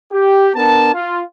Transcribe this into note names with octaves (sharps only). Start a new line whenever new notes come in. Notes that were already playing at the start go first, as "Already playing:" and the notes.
G4
B3 D4 A#4 A5
F4